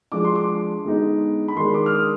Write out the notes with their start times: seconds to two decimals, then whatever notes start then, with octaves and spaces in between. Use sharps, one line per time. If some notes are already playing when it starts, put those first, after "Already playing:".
0.12 F3 G#3 D4 D6
0.24 C6
0.35 D6
0.85 D3 G#3 B3 D#4
1.48 B5
1.56 D#3 G#3 D4 C6
1.74 D6
1.86 F6
1.92 D#6